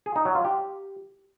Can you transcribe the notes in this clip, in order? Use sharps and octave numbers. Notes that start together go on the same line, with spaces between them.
G#4
D#4
F#3
F4
G4